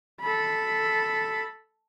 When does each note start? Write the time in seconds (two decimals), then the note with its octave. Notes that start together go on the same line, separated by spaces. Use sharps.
0.21 A4 B5